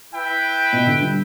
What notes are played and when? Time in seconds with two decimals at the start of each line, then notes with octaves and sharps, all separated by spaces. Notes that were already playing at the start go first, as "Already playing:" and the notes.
0.12 E4 B4 G5
0.73 B2
0.87 D3
1.02 G3